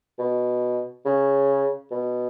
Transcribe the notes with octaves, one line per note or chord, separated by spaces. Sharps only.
B2
C#3
B2